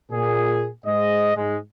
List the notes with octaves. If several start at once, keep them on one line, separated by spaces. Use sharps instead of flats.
A#2 G#4
G#2 G#3 D#5
G#2 G#3